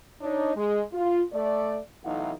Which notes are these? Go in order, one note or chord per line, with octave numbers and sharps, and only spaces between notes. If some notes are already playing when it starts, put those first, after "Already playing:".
D4 D#4 C#5
G#3
F4
A3 D5
B1 E3 A3 D#4 F5 F#5